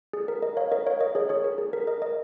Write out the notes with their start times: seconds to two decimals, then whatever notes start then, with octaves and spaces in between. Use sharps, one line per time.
0.13 G#4
0.28 A#4
0.42 A#4 D#5
0.57 C#5 F5
0.71 A#4 D#5
0.86 C#5 F5
1.00 A#4 D#5
1.15 G#4 C#5
1.29 G#4 C#5
1.44 A#4
1.58 G#4
1.73 A#4
1.87 A#4 D#5
2.02 A#4 D#5